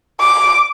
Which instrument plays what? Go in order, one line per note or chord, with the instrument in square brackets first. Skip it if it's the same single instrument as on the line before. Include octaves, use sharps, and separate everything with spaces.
[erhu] D6